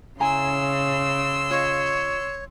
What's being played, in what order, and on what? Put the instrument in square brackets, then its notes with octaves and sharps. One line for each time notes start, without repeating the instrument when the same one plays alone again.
[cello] C#3 [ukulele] E4 G#5 A#5 [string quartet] C6 E6
[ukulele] F4 D#5 [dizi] C#5